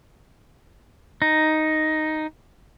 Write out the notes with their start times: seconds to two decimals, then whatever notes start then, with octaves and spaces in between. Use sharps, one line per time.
1.22 D#4